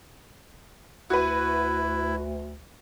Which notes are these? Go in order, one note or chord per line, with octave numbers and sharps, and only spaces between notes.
D2 E4 F#4 B4